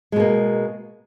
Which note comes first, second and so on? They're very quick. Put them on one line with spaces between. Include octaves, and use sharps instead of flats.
G#3 B2 A#3